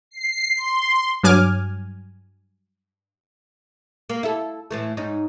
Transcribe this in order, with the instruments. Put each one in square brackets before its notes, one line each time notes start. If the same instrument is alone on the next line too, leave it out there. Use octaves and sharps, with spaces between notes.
[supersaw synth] C7
C6
[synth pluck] G2 F#3 G#5 D6 F6
[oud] A#3
E4 A4
A2 E3 A3
G#2 C#4 D#4